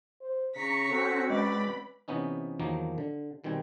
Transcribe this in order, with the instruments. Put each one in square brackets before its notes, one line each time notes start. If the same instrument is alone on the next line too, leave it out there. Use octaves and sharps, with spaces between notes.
[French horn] C5
[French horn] C#3 [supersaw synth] A#5 C#6 [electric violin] B6 C#7
[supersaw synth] C4 C#4 F#4 [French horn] A4
[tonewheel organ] G#3 [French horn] B4 [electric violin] D5 [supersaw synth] B5
[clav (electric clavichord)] C3 E3 B3 C#4 D#4
E2 D#3 F3 F#3 A#3 B3
D3
B2 D#3 G3 C4 G#5